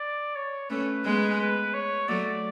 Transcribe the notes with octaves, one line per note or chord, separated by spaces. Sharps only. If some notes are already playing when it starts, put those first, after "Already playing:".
Already playing: D5
C#5
A3 C#4 B4
G#3 B3
B4
C#5
F#3 A3 D5